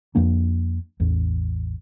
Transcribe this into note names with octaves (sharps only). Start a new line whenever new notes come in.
F2 F3 A#3 D4
A1 E2